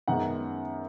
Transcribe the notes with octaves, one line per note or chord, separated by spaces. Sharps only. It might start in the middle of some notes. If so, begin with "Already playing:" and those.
F#2 D#3 G#3 B3 F#5